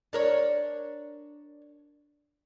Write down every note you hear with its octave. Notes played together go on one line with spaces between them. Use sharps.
D4 A#4 C#5